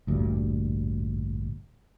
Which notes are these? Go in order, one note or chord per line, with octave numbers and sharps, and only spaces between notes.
A1 D2 G2 A#2